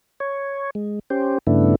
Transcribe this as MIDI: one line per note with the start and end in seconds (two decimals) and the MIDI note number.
0.20 0.70 73
0.75 0.99 56
1.10 1.38 61
1.10 1.38 67
1.10 1.38 72
1.47 1.75 43
1.47 1.75 49
1.47 1.75 57
1.47 1.75 59
1.47 1.75 62
1.47 1.75 64